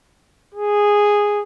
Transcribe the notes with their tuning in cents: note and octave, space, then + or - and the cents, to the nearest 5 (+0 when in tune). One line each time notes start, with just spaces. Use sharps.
G#4 -5